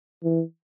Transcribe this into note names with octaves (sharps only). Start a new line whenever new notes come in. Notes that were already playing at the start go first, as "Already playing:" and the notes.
E3